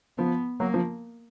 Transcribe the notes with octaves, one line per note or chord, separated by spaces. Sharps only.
F3 B3
F#3 A#3
F3